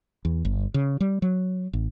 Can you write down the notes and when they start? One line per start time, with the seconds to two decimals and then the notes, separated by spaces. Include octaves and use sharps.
0.25 E2
0.45 G1
0.74 C#3
1.00 G3
1.22 F#3
1.73 A1